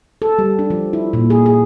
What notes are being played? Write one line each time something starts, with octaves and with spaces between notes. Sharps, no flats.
A4
G3
D4
F3
E4
A#2
G#4
G#4